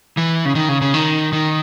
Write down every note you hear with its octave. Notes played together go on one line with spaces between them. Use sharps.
E3
C#3
D#3
C#3
C#3
D#3
D#3